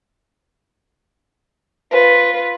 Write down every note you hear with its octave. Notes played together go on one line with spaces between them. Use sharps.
F4 B4